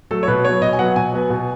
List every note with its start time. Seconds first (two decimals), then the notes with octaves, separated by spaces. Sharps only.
0.11 F#3 A3 A4
0.23 C#5
0.28 B2 B4
0.45 F#3 B3 C#5
0.61 B2 D#5
0.73 G#5
0.79 F#3 B3 F#5
0.96 B2 G#5
1.13 F#3 B3
1.30 B2